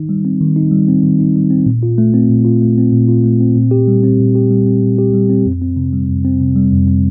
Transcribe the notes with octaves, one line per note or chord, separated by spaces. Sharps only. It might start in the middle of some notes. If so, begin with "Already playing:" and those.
Already playing: D#3 D#4
G3
C4
D#3
D#4
G3
C4
D#3
D#4
G3
C4
A#2
F4
A3
C4
A#2
F4
A3
C4
A#2
F4
A3
C4
A#2
G4
G3
C4
A#2
G4
G3
C4
A#2
G4
G3
C4
F2
C4
C3
G3
F2
C4
C3
G3
F2
C4